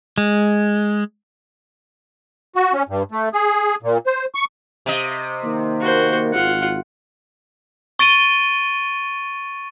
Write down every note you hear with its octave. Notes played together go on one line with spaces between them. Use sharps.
G#3
F#4
C#4
G2
A3
G#4
A#2
C5
C#6
C3 D#5
D#3 A#3
F#4 C5
G#1 F4 F#5
C#6 A6 D7 D#7 G7